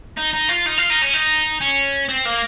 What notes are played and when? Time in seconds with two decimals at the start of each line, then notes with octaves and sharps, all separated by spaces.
0.17 D#4
0.33 D#4
0.49 F4
0.66 D#4
0.78 F4
0.90 D#4
1.02 C#4
1.14 D#4
1.61 C#4
2.09 C4
2.25 A#3